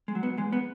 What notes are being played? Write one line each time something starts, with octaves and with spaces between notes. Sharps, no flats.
G#3
F#3
B3
E2 G#3
B3